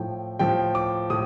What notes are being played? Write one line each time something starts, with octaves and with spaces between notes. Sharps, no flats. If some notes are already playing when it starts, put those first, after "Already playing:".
Already playing: A2 F3 G5
A2 F3 G5
D6
A2 D#6